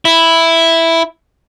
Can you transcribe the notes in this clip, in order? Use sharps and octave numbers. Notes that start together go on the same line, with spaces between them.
E4